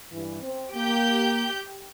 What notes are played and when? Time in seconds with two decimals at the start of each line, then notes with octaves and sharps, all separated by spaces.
0.12 G2 E3
0.42 C4
0.75 A#3 G4 G6